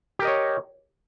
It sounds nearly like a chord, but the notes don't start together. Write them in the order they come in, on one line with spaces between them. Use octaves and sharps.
G4 A#4 D#5 C#5